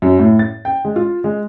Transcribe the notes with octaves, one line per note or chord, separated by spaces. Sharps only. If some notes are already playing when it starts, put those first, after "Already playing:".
F#2
A2
A6
G5
G#3
F4
G#3